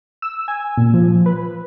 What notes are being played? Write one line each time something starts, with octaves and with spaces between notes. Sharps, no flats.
E6
G#5
A#2
F3
B4